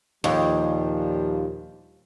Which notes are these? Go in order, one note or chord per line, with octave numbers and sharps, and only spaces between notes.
D#2 A#2 F3 G3